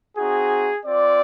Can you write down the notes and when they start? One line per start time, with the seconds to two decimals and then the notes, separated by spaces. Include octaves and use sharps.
0.17 C4 D#4 F#4 G#4
0.85 C4 F4 D5